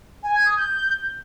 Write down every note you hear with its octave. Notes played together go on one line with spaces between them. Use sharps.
G#5
G#6
D#6
G6